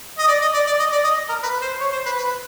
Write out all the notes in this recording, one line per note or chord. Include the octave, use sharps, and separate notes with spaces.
D#5
D5
D#5
D5
D5
D#5
D5
D#5
A#4
B4
C5
C#5
C5
B4
B4